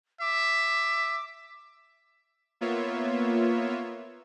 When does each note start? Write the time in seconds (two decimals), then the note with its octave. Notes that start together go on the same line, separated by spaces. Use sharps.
0.21 E5 D6
2.61 A#3 B3 F4 C#5 E5